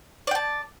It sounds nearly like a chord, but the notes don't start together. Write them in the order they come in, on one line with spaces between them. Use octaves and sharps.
D5 G5 A5